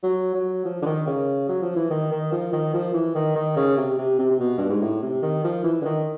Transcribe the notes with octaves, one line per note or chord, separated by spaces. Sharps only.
F#3
F#3
F3
D3
D#3
C#3
F#3
F3
E3
D#3
D#3
F3
D#3
F3
E3
D#3
D#3
C#3
C3
C3
C3
C3
B2
G2
G#2
A2
C3
D#3
F3
E3
D3
D#3